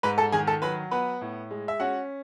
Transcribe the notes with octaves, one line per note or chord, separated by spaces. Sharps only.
G#2 B4 B5
A4 A5
D#3 G#4 G#5
A4 A5
F#3 B4 B5
B3 B4 B5
A2
G#3
E5
C#4 F#4 F#5